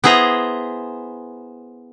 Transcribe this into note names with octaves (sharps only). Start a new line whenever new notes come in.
B3 E4 G#4 C5 A#5